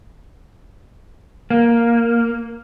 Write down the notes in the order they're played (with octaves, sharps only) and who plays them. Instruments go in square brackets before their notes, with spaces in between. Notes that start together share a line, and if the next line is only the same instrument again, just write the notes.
[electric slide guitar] A#3